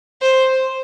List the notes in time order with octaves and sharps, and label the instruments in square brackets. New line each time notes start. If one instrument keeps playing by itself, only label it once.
[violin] C5